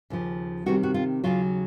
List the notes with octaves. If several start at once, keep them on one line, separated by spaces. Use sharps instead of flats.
D#2 C#3 F3
C3 D#3 G3 C4 F#4
F#4
F4
D#2 C#3 F#3 F4